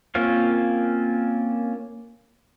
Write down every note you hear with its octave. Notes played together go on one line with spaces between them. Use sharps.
A#3 C4 C#4 F4 F5